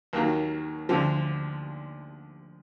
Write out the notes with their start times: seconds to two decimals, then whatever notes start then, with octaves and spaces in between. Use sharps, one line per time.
0.13 D#2 D#3 F#3 A#3
0.89 D2 D3 F3